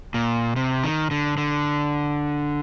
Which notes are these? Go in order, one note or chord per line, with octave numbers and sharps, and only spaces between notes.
A#2
C3
D#3
D3
D3